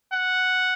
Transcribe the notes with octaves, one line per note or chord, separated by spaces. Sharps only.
F#5